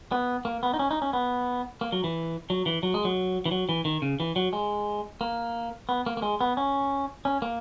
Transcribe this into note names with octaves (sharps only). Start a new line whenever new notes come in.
B3
A#3
B3
D#4
C#4
D#4
C#4
B3
A#3
F#3
E3
F#3
E3
F#3
G#3
F#3
E3
F#3
E3
D#3
C#3
E3
F#3
G#3
A#3
B3
A#3
A#3
G#3
B3
C#4
C#4
A#3